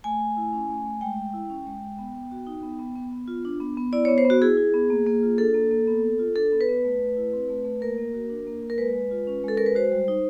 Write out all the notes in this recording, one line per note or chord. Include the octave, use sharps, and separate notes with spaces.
A3 G#5
A3
E4
C#4
A3
A3
G#3 G5
G#3
E4
C#4
G#3
G#3
B3
B3
F#4
D#4
B3
B3
B3
B3
F4
D4
B3
B3
E4 D5
B3 C#5
C5
B3
F#4
E4 G#4
E4
B3
A#3
A#3
F4
D4 A4
A#3
A#3
B3
B3
F4
D4 A4
B3
B4
B3
A3
A3
E4
C4
A3
A3
A#3 A#4
A#3
F#4
D4
A#3
A#3
A#4
G#3 B4
G#3
F4
C#4
G#3 A4
G#3 A#4
B4
F#4 C5
G3
D#4